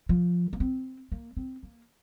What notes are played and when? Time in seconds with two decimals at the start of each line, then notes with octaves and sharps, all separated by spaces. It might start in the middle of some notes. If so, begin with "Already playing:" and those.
0.09 F3
0.53 A#3
0.60 C4
1.12 A#3
1.37 C4
1.63 A#3